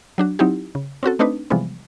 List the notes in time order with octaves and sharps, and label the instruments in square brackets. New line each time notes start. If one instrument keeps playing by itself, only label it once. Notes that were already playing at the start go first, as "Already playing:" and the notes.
[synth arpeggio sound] F#3 D4 F#4
F#3 C4 D#4 E4 G4
C#3
C4 C#4 F#4 A4
A3 C4 D4 D#4 B4
C3 E3 F3 G3 G#3 B3